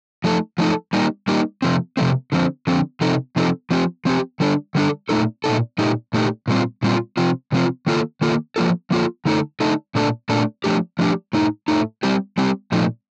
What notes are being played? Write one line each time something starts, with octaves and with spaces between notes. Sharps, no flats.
F3 A3 D#4 A4
F3 A3 D#4 A4
G3 A#3 D#4 G4
G3 A#3 D#4 G4
C3 F3 A3 C4
C3 F3 A3 C4
D3 F3 C4
D3 F3 C4
C3 F3 C4 D#4 A4
C3 F3 C4 D#4 A4
F3 C4 G4
F3 C4 G4
D3 G3 D4 A4
D3 G3 D4 A4
A#2 A3 D#4 A4
A#2 A3 D#4 A4
A#2 A3 D#4 G4
A#2 A3 D#4 G4
A#2 G3 C4 F4
A#2 G3 C4 F4
C3 F3 C4 F4
C3 F3 C4 F4
D#3 A#3 F4 A4
D#3 A#3 F4 A4
F3 A#3 F4 A4
F3 A#3 F4 A4
D3 A3 D#4 A4
D3 A3 D#4 A4
A#2 A3 D4 A4
A#2 A3 D4 A4
F3 A3 D4 G4
F3 A3 D4 G4
A2 A3 D#4
A2 A3 D#4
G3 C4 G4
G3 C4 G4
A#2 F3 A3 D#4